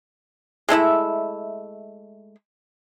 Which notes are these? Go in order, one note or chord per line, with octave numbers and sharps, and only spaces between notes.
G#3 A3 E4 E5